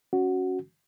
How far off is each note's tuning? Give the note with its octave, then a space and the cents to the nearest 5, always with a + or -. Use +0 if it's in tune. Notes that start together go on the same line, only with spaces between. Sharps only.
C#4 +0 F#4 +0